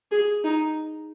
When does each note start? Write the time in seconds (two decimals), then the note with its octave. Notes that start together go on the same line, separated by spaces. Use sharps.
0.11 G#4
0.44 D#4